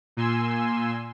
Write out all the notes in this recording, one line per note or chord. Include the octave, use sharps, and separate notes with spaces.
A#2 G#5 C6 E6